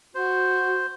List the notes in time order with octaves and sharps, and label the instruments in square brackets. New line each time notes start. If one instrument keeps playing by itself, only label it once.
[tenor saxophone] F#4 [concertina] C5